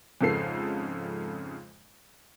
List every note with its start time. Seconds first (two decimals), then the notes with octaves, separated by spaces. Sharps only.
0.21 F2 G#2 C#3 A4 C7